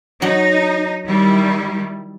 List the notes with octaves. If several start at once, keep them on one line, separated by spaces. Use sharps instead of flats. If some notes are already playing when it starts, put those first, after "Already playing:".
F#3 D#4
D#3 G3 E4